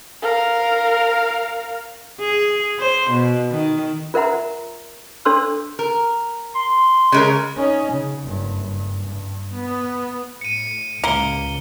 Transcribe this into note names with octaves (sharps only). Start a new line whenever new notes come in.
A#4 F5
G#4
C5
B2
D#3
F4 A#4 E5 F#5 A#5
D4 A4 C#5 C6 E6
A#4
C6
C#3 G#3 A#4
C#4 D#4
C#3
F#1 G2
G2
G2
B3
A2 C#7 D#7
C#2 A#3 C#7 G7